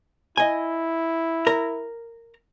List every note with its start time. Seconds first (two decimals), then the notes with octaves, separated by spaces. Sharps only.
0.37 E4 D#5 G#5
1.47 A#4 A#5